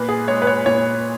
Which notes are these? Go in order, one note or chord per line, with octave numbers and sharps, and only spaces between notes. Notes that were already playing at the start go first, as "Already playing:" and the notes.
Already playing: A#2 B4
G#4
G#3 C#5
B4
C#5
A#2 C#5